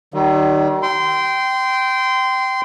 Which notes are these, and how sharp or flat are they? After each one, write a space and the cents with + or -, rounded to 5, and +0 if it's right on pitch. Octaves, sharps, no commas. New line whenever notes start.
D#3 -20 G3 -45
G5 -15 C6 -20